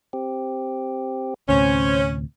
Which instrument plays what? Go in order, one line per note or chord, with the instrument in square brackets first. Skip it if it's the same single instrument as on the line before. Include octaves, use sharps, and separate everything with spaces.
[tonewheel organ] C4 G4
[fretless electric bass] D2 A2 C3 [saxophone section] C#4 [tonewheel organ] C5 G6